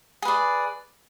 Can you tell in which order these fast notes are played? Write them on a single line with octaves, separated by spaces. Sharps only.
G#4 B4 D5